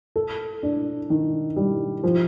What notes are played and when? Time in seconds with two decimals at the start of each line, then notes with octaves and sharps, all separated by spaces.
0.16 A4
0.63 D4
1.10 D#3
1.56 G3
2.04 F3